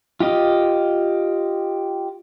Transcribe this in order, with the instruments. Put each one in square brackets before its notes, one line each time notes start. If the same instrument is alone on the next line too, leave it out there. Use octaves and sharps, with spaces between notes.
[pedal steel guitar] F4 G4 D#5